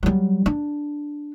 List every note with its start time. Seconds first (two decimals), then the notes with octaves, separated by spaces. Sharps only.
0.03 F#3 G3
0.46 D4